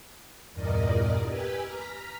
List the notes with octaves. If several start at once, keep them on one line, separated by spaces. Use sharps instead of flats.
E2 G2 A#2 A#4 D5 D#5
G4 B4 G#5 E6
A#5 F6 B6